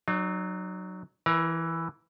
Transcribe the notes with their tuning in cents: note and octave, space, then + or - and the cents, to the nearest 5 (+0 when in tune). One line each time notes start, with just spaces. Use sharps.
F#3 +5 D#4 -45
E3 +0 A#4 +30 A#5 +0